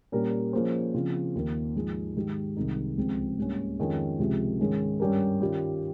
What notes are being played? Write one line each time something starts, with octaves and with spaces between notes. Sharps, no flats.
A#2 G3 C#4 G4 A#4
F3 A#3 C#4 G#4 C5
C#3 F3 C4 F4
D#2 D#3 A#3
G#2 F3 G#3 D#4 G#4
G#2 D#3 G#3 D#4 G4
C2 C3 D#3 G#3 D#4
C#2 C3 F3 G#3 C4
G#2 G3 A#3 C#4
F2 D#3 G#3 C#4 F4
C#2 C3 F3 G#3
G#2 D#3 G#3 C#4
G2 G3 C#4 G4 A#4
D#3 G3 C#4 F4